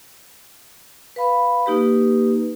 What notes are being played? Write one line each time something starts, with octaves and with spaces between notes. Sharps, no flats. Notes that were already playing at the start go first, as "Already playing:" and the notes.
B4 F5 B5
A#3 D#4 G4 B4